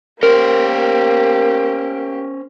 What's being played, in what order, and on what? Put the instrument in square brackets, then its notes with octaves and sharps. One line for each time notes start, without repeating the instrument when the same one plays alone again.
[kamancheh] A#3 G4 [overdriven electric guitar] C#4 C5 [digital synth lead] A#4